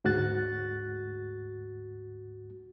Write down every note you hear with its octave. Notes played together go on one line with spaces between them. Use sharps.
D2 G#2 F#4 F#6 A6